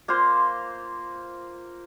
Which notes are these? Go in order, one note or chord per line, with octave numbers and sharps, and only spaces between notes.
A#3 F4 C5 C6